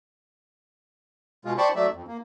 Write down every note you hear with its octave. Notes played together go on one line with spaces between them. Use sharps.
B2 G#3 F4
C5 D5 G5 A5 B5 C#6
F#3 A3 D5 E5
F2
A#3